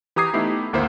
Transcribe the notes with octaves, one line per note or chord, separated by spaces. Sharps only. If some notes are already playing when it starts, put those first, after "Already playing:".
E3 G4 A#5 D#6 G#6 C7
A3 B3 D#4 E4 G4
G#1 D2 A#3 E4 C5